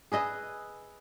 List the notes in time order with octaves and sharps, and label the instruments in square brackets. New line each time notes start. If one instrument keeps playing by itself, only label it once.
[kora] G#4 B4 D#5 E5